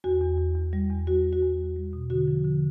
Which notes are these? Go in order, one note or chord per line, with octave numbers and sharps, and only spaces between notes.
E2 F#4
E2
E2
E2
G3
E2
G3 F#4
G3
F#4
E2
G3
G3
B2
D3 F#4
F3
D3